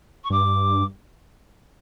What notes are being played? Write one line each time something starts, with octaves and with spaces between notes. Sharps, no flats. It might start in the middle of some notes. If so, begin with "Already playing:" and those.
C#6
G2 D6